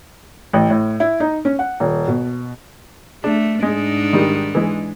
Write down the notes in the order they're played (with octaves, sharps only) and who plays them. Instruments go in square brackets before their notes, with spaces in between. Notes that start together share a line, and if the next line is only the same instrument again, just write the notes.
[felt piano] A1
A2
E4
D#4
C#4
F#5
D#1
B2
[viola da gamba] A3 [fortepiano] D4
[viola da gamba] G#2 D4 D#4 [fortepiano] G#3
[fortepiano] D#3 G3
E3 G#3